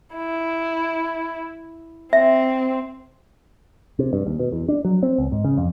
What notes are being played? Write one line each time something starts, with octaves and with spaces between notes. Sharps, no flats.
E4
C4 E5
C3
G2
D#2
B2
E2
D4
F#3
C4
C#2
G#2
C#3
F2